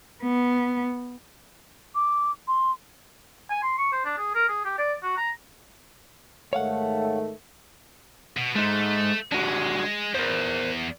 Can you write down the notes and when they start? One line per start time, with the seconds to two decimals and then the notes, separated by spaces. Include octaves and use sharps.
0.23 B3
1.95 D6
2.48 C6
3.50 G#5
3.63 C6
3.78 C#6
3.93 C5
4.05 D4
4.18 G#4
4.35 A#4
4.49 G#4
4.65 G4
4.78 D5
5.03 F#4
5.17 A#5
6.53 G#2 D#3 A3 C#5 F5 F#5
8.37 B2
8.56 G#3 A3 D#4
9.32 G#3 D4 F#4 G4
10.14 E2 A#4 C5